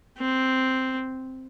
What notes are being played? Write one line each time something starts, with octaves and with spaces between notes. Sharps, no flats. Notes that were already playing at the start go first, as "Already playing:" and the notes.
C4